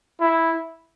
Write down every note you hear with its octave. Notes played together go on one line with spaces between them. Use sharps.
E4